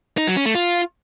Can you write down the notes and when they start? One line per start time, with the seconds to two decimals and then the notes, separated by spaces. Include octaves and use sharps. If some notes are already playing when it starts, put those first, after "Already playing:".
0.18 D#4
0.27 F#3
0.36 C#4
0.46 A3
0.55 F4